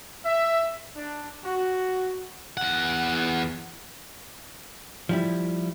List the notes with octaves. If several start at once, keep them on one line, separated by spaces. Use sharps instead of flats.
E5
D4
F#4
E2 F#5
F3 G3 E4